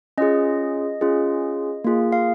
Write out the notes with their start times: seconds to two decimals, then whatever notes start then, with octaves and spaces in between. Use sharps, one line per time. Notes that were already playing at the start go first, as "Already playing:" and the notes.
0.18 C#4 F4 G#4 D#5
1.01 C#4 F4 G#4
1.84 A#3 F4 G#4
2.12 F5